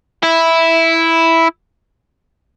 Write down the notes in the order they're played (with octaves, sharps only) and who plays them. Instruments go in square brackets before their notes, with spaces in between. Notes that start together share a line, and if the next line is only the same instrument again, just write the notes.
[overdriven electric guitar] E4